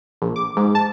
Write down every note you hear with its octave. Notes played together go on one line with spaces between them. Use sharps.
A#1
D6
G#2
A5